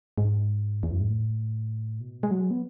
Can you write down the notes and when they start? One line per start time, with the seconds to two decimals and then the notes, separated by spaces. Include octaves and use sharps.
0.18 G#2
0.83 E2
0.92 F#2
1.01 G#2
1.09 A2
2.00 B2
2.23 G#3
2.31 F#3
2.51 B3